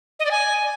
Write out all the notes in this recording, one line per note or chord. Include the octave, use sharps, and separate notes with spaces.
D#5
D5
G#5